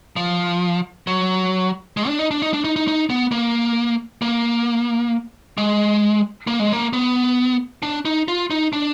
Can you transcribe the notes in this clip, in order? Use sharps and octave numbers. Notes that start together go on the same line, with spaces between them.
F3
F#3
G#3
D4
D#4
D4
D#4
D4
D#4
D#4
D#4
B3
A#3
A#3
G#3
A#3
G#3
A#3
B3
D4
D#4
F4
D#4
D4